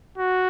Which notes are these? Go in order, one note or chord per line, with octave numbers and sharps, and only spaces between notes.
F#4